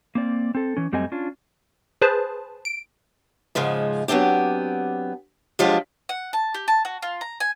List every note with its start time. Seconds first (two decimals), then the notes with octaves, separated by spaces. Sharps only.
0.15 A#3 C4 D5
0.55 C4 A4
0.77 E3 C#4
0.92 F#2 G3 A3 C4 D#5 G#5
1.12 C#4 D4 F4
2.01 G#4 B4 C5 A5
2.65 D7
3.55 G#2 C#3 F3 G#3
4.08 F#3 B3 C4 D4 G4
5.59 F3 F#3 G#3 D4 F4 G4
6.09 F#5
6.33 A5
6.54 G4
6.68 A5
6.85 F#4
7.02 F4
7.21 A#5
7.40 G#5